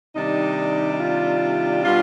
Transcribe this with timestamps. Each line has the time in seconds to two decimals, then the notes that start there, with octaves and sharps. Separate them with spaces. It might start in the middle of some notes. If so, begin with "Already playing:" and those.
0.15 C3 D#3 G3 D4 D#4
0.92 D#4
1.00 F4
1.84 B2 G3 D4 F4